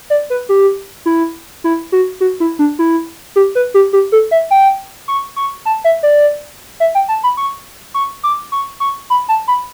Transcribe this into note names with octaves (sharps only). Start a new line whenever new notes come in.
D5
B4
G4
E4
E4
F#4
F#4
E4
D4
E4
G4
B4
G4
G4
A4
E5
G5
C#6
C#6
A5
E5
D5
E5
G5
A5
B5
C#6
C#6
D6
C#6
C#6
B5
A5
B5